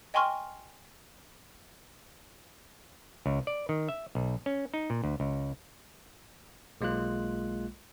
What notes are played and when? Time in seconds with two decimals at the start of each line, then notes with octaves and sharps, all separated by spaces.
0.14 D#5 G5 G#5 C6 C#6 F6
3.26 C#2
3.47 D5
3.69 D#3
3.89 E5
4.15 B1
4.46 C#4
4.74 D#4
4.90 A#2
5.04 D2
5.20 C#2
6.81 B1 G#3 A#3 F4 F#6